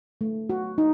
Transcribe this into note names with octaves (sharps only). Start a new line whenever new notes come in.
A3
F#4
D#4